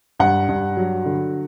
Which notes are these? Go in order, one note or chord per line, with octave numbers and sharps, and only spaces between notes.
G2 F#5
G2
F#3
D3